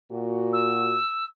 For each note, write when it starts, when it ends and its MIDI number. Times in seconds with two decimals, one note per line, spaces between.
0.11 0.97 46
0.11 0.97 66
0.53 1.24 88